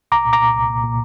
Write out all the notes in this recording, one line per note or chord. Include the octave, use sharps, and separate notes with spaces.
C2 A#5 D6
A#2
A#5 D6
A#2
C2
A#2
A#2